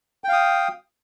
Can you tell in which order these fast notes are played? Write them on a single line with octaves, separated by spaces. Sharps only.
G5 F5 D#6